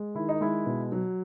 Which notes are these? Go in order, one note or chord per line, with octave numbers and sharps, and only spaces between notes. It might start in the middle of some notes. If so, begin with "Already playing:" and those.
Already playing: G#3
D#3 E4
D#4
G#3 E4
B2
F#3